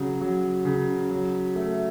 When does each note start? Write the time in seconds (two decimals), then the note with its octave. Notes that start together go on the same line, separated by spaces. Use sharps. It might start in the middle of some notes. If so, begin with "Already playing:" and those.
Already playing: C#3 F#3
0.21 F#3
0.65 C#3
1.11 F#3
1.56 A3